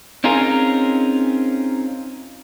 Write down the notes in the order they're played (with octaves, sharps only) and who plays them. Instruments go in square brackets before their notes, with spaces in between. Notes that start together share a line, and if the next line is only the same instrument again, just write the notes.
[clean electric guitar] C4 C#4 D#4 F4 G#4 A#4